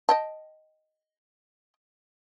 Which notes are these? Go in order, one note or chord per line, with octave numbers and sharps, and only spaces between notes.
D#5 G5 A5